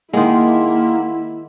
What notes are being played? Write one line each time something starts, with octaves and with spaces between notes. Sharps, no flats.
D#3 G#3 A#3 E4 F#5 C6